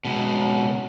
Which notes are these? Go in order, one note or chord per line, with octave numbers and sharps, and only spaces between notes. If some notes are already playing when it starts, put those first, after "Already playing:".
C#2 B2